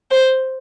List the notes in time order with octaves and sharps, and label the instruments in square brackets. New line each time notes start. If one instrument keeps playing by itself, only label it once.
[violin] C5